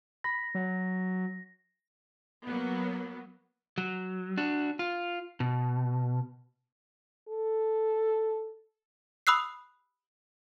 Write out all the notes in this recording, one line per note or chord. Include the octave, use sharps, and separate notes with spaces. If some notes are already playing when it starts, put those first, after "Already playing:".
B5 A#6
F#3
F#3 A#3 B3
F#3
D4 F#4
F4
B2
A4
B5 D#6 E6 F#6 C7